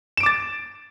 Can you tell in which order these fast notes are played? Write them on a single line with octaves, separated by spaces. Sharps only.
E7 D7 D6 A6